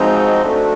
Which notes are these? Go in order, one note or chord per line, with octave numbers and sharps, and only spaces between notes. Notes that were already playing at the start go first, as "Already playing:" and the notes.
Already playing: F3 G#3 C4 D#4 F#4
A3 D4 F#4